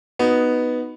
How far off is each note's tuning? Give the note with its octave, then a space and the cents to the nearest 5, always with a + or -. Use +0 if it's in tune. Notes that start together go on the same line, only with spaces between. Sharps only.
B3 +0 D#4 +0 F#4 +0